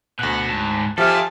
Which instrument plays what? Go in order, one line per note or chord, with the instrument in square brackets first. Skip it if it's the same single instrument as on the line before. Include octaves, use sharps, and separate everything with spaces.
[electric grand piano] D2 F#6 [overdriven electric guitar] B2 F#5
[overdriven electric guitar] G#2 A5
[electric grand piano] F3 G4 [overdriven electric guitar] F4 A4 [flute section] E5 G#5 F6 [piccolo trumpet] A5